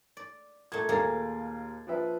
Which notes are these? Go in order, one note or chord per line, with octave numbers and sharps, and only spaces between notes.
D5
A#2 A3 G#6
D#2 A#3 G#4 A#4 C#5 A6
F3 B4 E5